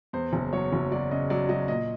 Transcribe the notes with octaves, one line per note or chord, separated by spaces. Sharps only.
E2 C5
F#1
F#3 C#5
F#1
F#3 D5
C#3 D#5
F#3 D5
F#3 D#5
A#2 D#5